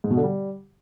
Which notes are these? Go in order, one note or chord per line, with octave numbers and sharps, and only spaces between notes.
G#2
B2
D3
G3